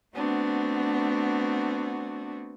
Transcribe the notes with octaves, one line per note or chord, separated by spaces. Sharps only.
A3 B3 C4 D4 F#4